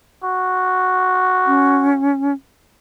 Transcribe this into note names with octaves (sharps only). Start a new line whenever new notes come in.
F#4
C#4